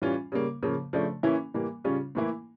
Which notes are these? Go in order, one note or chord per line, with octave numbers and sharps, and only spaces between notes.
E3 G3 C#4 F4
C#3 G3 A#3
C#3 F3 A#3
C#3 F3 A3 D4
E3 A#3 C#4 E4
E3 G3 A#3
C#3 G3 C#4 F4
A2 E3 A#3 E4